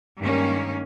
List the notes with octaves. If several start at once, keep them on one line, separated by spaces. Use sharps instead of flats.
G2 D#3 G#3 A#3 C#4